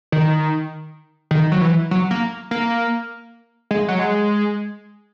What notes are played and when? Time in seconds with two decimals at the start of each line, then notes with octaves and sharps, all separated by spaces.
0.12 D#3
1.31 D#3
1.52 F#3
1.61 E3
1.91 F#3
2.11 A#3
2.51 A#3
3.71 G#3
3.88 F#3
3.99 G#3